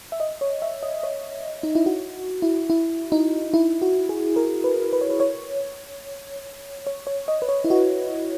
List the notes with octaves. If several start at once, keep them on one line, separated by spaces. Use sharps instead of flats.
E5
D#5
C#5
E5
D#5
C#5
D#4
E4
F#4
E4
E4
D#4
E4
F#4
G#4
A#4
B4
B4
C#5
B4
C#5
C#5
C#5
D#5
B4
C#5
E4
F#4